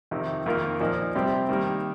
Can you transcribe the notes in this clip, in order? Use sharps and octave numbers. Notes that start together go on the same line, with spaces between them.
F2 C3 D#3
F2 D#3 A#3 F4 A#4
A#2 F3 D#4 A#4
C3 G3 C4 G4
D#3 G3 A#3